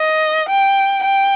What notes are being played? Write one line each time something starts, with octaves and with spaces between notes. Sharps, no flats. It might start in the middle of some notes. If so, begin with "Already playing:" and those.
Already playing: D#5
G5
G5